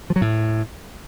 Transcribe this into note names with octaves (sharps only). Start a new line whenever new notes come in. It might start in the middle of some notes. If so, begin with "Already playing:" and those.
F3
F#3
A2